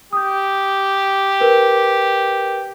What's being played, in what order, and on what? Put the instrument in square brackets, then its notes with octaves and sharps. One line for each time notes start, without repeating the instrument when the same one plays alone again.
[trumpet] G4 [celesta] D#6 G6
[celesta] A#4 B4